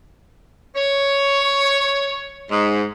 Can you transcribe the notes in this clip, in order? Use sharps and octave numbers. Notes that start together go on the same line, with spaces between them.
C#5
G#2